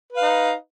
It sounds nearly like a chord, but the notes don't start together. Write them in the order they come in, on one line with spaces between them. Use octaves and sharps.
B4 F5 D#4